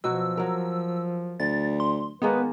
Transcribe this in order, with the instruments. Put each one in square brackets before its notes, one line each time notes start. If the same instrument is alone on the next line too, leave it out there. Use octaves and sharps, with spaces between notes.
[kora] B2 F#3 F#4 [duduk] F3 [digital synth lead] E6
[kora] F#3 A#4
[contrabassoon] D2 [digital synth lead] A6
[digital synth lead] C6
[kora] D#3 G#3 A#3 [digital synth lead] B3 [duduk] B4